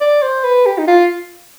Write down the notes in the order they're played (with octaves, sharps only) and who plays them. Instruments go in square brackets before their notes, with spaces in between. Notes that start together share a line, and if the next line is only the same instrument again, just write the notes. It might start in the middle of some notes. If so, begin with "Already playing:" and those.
[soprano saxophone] D5
C5
B4
G4
D#4
F4